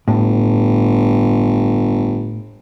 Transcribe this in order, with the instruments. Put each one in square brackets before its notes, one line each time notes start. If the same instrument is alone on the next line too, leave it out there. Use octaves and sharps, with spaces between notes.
[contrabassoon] G1 [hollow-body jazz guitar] A2